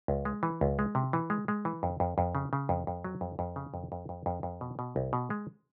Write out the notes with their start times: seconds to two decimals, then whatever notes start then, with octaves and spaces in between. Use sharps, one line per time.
0.08 C#2
0.25 G#3
0.43 E3
0.61 C#2
0.79 G#3
0.95 C3
1.13 E3
1.30 G#3
1.48 G#3
1.65 E3
1.83 F2
2.00 F2
2.18 F2
2.35 C#3
2.53 C#3
2.69 F2
2.87 F2
3.04 F#3
3.21 F2
3.39 F2
3.56 C#3
3.74 F2
3.92 F2
4.09 F2
4.26 F2
4.43 F2
4.61 B2
4.79 B2
4.96 C2
5.13 B2
5.30 G#3